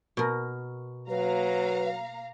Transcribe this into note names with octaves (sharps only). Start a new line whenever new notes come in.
B2 A#4
F#3 A#3 B4 F5 A#5